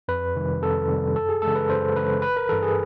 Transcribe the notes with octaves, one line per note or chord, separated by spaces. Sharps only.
F2 B4
C3 D#3 G3
F2 A4
C3 D#3 G3
F#2 A4
G#4
C#3 E3 G#3 A4
B4
F#2 C5
C#3 E3 G#3 B4
G1 B4
A#4
G2 E3 A4
G#4